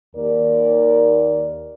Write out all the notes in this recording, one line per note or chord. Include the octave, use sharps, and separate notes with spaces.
D#2 A#4 D5